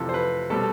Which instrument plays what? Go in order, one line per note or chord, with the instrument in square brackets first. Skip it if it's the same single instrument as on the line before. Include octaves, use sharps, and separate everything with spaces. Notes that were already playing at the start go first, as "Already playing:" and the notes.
Already playing: [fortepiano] F2 C3 E3 A4
C5
B4
B2 G3 C4 A4